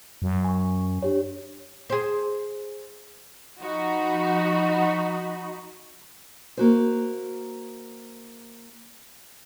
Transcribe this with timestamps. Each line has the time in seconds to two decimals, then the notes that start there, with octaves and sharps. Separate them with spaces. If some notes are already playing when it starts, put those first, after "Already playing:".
0.22 F#2
0.44 G#5 C#6
1.03 D4 G4 C#5
1.90 G#4 C5
3.61 F3 D#4 F#4 B5
6.57 A#3 F#4 C5